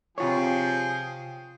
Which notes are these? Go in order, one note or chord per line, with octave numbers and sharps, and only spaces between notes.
C3 F3 F4 G#4 C#5 G5